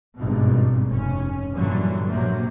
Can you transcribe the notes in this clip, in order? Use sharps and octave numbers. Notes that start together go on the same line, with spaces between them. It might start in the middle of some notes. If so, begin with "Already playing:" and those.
G#1 G2 B2
F1 C#4
G2 A#2 D3 E3 F#3 G3
A#1 C3 F#3 A#3